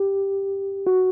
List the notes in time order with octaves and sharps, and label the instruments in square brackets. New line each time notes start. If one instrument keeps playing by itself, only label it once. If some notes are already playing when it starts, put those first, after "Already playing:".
Already playing: [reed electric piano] G4
F#4